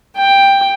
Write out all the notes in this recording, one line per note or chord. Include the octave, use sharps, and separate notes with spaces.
G5